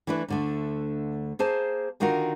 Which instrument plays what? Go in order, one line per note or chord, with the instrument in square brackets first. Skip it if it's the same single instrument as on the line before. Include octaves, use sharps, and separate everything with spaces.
[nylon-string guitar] E3 A3 D4 E4 B4
D2 D3 A3
A#3 G#4 C5 A5
D3 D#3 D#4 F4 F#4 A#4